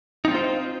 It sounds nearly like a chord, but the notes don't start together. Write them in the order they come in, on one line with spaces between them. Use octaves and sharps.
D#4 C4 F4 C5